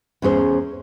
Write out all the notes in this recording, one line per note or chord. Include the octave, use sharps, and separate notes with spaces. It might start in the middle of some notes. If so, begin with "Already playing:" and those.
E2 C#4 G#4 C5